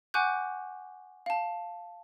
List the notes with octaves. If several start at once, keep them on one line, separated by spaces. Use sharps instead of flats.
F#5 G#5 C#6 D6 F#6 G6
F5 A5